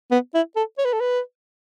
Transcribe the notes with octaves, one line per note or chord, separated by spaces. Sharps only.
B3
E4
A4
C#5
B4
A4
B4